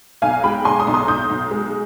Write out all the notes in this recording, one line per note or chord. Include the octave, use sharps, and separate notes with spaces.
B1 F5 G#5
G#3 G5 B5
B1 G#5 C6
C6 D#6
B1
C6 D#6
B1 D#6 G6
B1
G#3